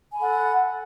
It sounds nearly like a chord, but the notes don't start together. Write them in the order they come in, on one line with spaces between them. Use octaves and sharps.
G#5 B5 A4 F#5